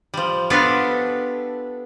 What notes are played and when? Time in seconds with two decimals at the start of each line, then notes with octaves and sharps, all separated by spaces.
0.14 F3 G3
0.50 B3 D4 F4 G4 A4